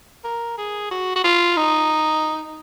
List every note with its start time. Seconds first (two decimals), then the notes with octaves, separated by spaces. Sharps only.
0.24 A#4
0.58 G#4
0.91 F#4
1.16 F#4
1.24 F4
1.57 D#4